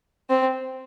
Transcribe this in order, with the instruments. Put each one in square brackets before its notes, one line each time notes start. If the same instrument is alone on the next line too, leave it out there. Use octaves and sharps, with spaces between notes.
[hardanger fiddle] C4